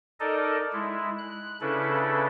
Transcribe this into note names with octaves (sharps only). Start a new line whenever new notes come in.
D#4 A4 A#4 D5 D#5
G#3 E4
F#6
C#3 C#4 D4 E4 A4 B4